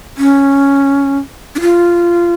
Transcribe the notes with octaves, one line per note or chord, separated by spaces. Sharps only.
C#4
D4
F4